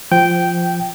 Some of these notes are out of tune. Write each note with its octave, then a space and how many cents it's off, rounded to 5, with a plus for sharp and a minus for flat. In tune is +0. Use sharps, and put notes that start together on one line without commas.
F3 -10 G5 -10